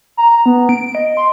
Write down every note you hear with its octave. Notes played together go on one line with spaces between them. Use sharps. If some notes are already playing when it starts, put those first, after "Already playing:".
A#5
B3
D7
D#5
C6